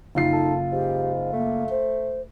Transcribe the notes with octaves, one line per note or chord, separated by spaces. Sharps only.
F#1 D#4 F4 C7
A4
G#2 G4
A3 A#3
C5